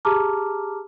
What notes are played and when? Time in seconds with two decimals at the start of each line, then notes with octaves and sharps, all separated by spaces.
0.05 G4 G#4 A5 A#5 D6 F6